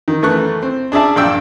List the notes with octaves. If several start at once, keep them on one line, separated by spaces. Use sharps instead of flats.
D#3
F#2 E3 A3 C#6 F#6
C4
D4 G#4 D5 E5 A5
A#1 G2 D4 G5 E6